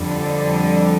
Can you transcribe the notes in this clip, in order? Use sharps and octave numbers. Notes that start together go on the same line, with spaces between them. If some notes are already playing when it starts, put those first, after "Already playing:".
Already playing: F2 D3 G3